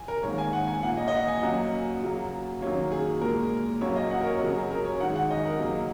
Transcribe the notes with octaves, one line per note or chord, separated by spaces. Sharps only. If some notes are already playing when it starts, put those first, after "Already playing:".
Already playing: G#5
A#4
G#2 D#3 A#3 C#5
G#5
F#5
G#5
A#2 A#3 F#5
D#5
D#5
F#5
G#5
F#2 F#3 A#3 F#5
C#3 F#3 A#3
F#2 D#3 F#3 A#3 C#5
G#4
A#2 G#3 A#4
F#2 F#3 A#3 C#5
D#5
F#5
A#4
C#5
F#2 C#3 F#3 A#4
G#4
A#4
C#5
F#2 D#3 G#3 F#5
F#5
D#5
A#4
C#3 F#3 A#3